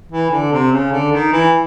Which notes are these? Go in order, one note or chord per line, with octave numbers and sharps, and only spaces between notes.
E3
D3
C3
C#3
D3
D#3
E3